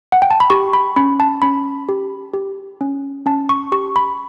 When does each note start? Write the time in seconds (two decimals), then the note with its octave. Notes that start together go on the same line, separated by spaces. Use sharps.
0.12 F#5
0.22 G5
0.31 A5
0.40 B5
0.50 G4 C#6
0.73 B5
0.96 C#4 B5
1.20 A5
1.42 C#4 B5
1.89 G4
2.34 G4
2.81 C#4
3.26 C#4 A5
3.49 C#6
3.72 G4 C#6
3.96 B5